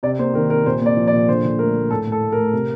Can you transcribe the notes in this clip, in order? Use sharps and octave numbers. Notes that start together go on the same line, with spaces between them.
C3 D5
A#3 C5
D#3 A#4
C3 A#4
A#2 C5
A#3 D5
F3
D5
A#2
D3 C5
D3
A3 A#4
A3
A2 A4
A2
A4
A3
A3 A#4
C3